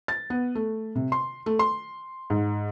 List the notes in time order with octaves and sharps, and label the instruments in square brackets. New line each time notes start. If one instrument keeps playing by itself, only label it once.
[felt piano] A6
B3
A3
C3
C6
A3
C6
G#2